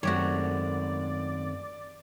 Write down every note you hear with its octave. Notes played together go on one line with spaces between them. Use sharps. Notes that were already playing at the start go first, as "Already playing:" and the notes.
F#2 D#3 A3 C4 F#4 G4 C#5 D5